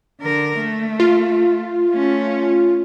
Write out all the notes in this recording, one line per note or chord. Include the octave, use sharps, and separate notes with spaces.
D3 A#4
A3
F4
A3 C#4